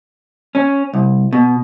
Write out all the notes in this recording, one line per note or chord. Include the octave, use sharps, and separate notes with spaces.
C#4
C2
B2